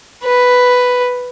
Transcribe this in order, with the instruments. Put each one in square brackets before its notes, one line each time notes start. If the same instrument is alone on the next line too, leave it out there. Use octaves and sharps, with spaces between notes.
[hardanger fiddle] B4